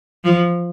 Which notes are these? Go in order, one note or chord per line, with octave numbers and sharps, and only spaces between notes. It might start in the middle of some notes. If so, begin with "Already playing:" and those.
F3